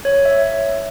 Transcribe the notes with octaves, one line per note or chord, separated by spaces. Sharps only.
C#5
E5